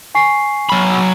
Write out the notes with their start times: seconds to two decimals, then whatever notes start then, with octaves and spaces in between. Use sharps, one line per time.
0.15 G#5 C#6 C7
0.69 F#3 B5